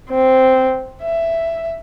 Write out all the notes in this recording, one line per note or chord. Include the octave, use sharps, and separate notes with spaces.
C4
E5